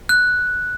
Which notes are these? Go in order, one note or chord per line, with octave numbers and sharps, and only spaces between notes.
F#6